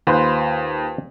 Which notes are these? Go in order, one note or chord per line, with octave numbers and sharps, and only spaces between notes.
D#2 F4 B4 C5